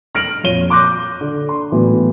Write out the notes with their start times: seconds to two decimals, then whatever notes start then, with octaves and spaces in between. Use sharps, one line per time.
0.15 F6 A#6 D7 F#7
0.44 F2 A#2 F4 C#5 D#7 G7
0.70 C6 D6 F#6 G6 A#6
1.21 D3
1.49 C6
1.72 A2 E3 F#3 B3